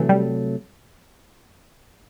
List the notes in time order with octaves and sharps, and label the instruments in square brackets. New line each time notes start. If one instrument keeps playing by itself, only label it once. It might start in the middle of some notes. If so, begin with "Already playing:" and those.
Already playing: [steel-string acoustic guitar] C3 F#3 A3 [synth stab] E3
[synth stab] G3